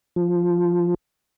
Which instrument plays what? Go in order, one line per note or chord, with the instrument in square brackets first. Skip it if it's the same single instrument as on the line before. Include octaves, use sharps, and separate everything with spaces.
[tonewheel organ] F3